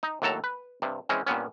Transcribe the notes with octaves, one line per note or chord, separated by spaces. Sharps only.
D#4
D#2 A2 F#3 A4 A5 A#5
B4
G2 C3
E3 G#3 C4 C#4
G2 A#2 B3 C#4